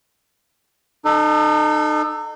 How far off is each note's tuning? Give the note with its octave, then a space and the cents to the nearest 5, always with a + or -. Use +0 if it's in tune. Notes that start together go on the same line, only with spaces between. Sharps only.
D#4 -35 A4 +0